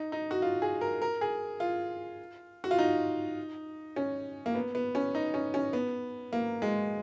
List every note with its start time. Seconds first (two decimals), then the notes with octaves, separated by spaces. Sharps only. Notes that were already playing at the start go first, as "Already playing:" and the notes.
Already playing: D#4
0.12 D#4
0.31 F#4
0.42 F4
0.62 G#4
0.81 A#4
1.02 A#4
1.21 G#4
1.60 F4
2.64 F#4
2.71 F4
2.79 D#4
3.96 C#4
4.46 A#3
4.55 B3
4.75 B3
4.95 C#4
5.15 D#4
5.34 C#4
5.54 C#4
5.73 B3
6.33 A#3
6.62 G#3